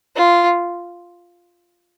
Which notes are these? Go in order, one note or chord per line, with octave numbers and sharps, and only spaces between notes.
F4